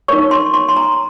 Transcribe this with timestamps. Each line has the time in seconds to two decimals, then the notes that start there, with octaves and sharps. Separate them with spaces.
0.08 D#4 A#4 C#5 C#6
0.31 C6
0.54 C6
0.68 C6
0.76 A#5